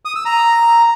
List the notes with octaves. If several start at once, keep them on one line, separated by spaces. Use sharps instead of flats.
D#6
E6
A#5